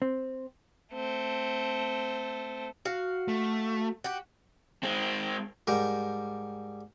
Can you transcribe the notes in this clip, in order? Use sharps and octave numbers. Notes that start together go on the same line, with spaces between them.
C4
A3 C4
F#4 F5
A3
F#4 G4
G#3 C4
G#2 G3 A#4